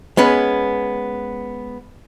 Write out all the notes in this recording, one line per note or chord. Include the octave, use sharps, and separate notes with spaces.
G#3 B3 C#4 B4